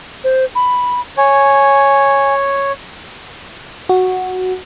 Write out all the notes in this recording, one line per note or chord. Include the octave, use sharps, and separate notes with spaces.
C5
B5
C#5 G#5
F#4